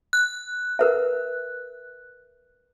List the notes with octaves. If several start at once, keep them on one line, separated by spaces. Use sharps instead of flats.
F#6
A#4 B4 E5